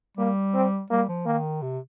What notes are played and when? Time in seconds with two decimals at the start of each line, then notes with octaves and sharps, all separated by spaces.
0.17 G3 A#3
0.54 C4
0.90 G3 A#3
1.08 F3
1.26 D#3 A#3
1.62 C3